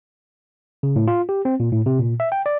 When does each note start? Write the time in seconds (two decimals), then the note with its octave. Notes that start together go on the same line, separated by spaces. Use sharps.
0.83 C#3
0.96 A2
1.08 F4
1.29 G4
1.45 C4
1.60 A#2
1.72 A2
1.86 C3
1.99 A#2
2.20 E5
2.32 G5
2.46 D5